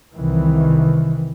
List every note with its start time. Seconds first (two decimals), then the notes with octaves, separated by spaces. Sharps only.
0.17 C2 D#3 E3